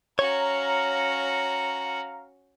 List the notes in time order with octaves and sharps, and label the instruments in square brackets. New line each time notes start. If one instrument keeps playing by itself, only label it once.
[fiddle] C#4 F#4 [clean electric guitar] C#5 [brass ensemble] F5 A#5